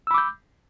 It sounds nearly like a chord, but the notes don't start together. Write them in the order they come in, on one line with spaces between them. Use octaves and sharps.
E6 B5 D6 G6